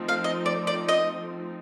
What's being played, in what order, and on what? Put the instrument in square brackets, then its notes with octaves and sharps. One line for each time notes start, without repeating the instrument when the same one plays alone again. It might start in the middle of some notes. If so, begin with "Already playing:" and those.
Already playing: [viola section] F3 A3 C4 D#4
[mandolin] F5
D#5
D5
D5
D#5